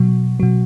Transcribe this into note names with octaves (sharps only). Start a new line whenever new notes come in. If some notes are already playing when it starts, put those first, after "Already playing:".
Already playing: B2 F#3
B2 F#3